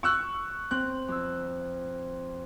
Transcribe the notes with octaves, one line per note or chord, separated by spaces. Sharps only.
C#6 E6 F#6
C4 F#6
F2 E6